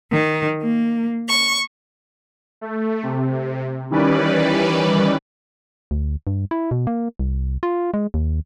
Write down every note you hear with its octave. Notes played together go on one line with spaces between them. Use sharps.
D#3
A#3
C#6
A3
C3
D#3 E3 G3 C#4 B4 D5
D2
G2
E4
B2
A#3
C2
F4
G#3
D#2